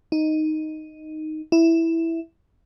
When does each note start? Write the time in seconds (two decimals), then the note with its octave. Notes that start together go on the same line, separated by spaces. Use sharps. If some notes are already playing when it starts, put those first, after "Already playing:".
0.12 D#4
1.52 E4